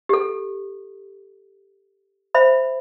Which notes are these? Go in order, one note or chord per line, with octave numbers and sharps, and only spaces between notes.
G4 A4
C5 E5 B5